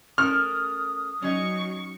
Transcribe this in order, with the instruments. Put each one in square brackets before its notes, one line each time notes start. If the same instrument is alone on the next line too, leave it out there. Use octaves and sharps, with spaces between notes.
[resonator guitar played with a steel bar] A3 C#4 A#4 [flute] D#6 [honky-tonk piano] F6
[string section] F#3 C#6 [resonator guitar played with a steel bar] C#4 D#4 D#5